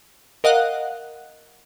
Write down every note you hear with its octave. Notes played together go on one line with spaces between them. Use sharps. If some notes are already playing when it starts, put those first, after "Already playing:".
A#4 D#5 F5 F#5 F#6